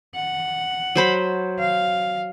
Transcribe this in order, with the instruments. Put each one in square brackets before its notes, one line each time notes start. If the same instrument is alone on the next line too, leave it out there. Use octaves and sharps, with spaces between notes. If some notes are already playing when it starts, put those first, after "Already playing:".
[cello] F#5
[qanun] F#3 C5 B5
[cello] F5